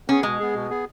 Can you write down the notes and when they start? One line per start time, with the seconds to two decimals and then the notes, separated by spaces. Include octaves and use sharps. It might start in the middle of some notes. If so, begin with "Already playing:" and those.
0.08 B3 C#4 G#4
0.23 B2 G#3
0.39 B3 G#4
0.54 B2
0.70 B3 G#4